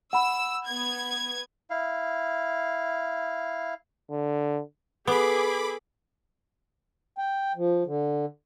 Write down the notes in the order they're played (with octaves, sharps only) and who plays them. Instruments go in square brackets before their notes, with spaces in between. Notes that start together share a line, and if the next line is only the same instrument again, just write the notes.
[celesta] F#5 B5 [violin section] E6
[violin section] B3 G#6
[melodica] E4 F5
[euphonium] D3
[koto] B3 [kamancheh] G#4 [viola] A4 [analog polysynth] B5 D6
[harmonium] G5
F3
D3